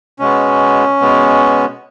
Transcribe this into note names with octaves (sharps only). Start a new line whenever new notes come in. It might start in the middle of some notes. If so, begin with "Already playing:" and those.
B2 G#3 B3 C#4
B2 G#3 B3